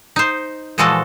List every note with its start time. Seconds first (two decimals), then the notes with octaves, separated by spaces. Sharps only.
0.16 D#4 C5
0.78 A#2 E3 F3 G#3 F#4 A4